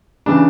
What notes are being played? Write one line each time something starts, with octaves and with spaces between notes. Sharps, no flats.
C#3 E3 D4